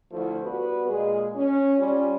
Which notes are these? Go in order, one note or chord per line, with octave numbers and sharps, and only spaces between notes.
D2 D3 F3 A3 E4 A4
G3 B3 F#4 B4
A#2 G#3 G#4
C#4
G3 C#4 F4